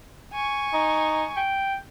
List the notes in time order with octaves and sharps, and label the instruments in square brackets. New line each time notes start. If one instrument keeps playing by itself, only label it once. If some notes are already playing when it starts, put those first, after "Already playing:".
[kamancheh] G#5 C#6
[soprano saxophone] D#4
G5